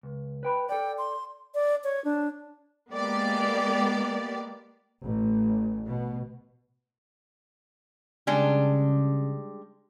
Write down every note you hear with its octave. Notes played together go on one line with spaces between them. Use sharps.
C#2
B4 G5 B5
A4 D5 G5
C6
D5
C#5
D4
G#3 A#3 B3 G4 D5
A1
B2
C#3 G3 G#3 D4